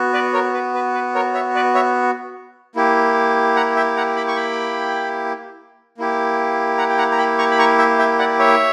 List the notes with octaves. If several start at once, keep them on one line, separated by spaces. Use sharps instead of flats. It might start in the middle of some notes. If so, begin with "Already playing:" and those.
Already playing: B3 F#4
B4 D5
A#4 C#5
B4
B4
B4
A#4 C#5
C#5 E5
B4 D5
C#5 E5
A#3 E4 G4
F#5 A#5
E5 G5
F#5 A#5
G5 B5
C#6
G5 B5
A#3 E4 G4
F#5 A#5
G5
F#5 A#5
A#5
G5 B5
A#5 C#6
B5
A#5 C#6
E5 G5
E5 G5
D5 F#5
C#5 E5